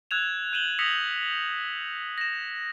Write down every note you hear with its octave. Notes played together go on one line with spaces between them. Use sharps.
E6 F#6 G#6 E7 F7
G6 D#7 E7 F#7 G7
D#6 E6 A#6 B6 C#7 F7
A#6 E7